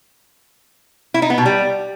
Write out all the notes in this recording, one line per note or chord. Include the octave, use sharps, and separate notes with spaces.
E4
D#4
B3
B2
G3